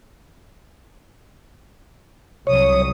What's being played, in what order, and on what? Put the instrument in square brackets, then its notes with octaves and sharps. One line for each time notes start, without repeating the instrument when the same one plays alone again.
[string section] C2 F#3 D#6 [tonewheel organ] C#5